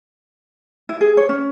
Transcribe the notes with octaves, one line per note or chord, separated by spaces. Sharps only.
E4
G#4
C#5
C#4